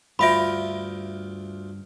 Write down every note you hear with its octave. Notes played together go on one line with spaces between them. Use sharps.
D2 G2 F4 E5 F5 G5 B5